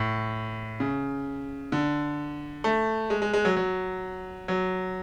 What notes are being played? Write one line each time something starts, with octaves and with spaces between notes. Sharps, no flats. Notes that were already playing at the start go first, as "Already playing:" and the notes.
Already playing: A2
C#3
D3
A3
G#3
G#3
G#3
F#3
F#3
F#3